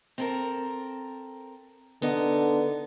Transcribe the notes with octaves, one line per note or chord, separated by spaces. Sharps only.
C4 A4 A#4
D3 B3 D#4